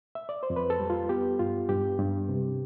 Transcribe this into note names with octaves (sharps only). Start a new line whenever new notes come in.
E5
D5
C5
F2
B4
A4
G3
F4
B3 G4
G2 F4
G2 G4
G2
C3